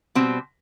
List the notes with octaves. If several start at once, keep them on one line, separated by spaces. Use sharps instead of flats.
B2 G3 C4